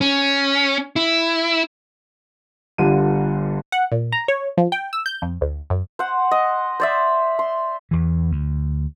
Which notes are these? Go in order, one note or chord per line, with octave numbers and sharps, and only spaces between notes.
C#4
E4
G1 G2 D3 F4 D#7
F#5
A#2
A#5
C#5
F3
G5
E6
G6
F2
D2
F#2
C5 F#5
D#5
C5 D5 E5
C6
E2 E3
D2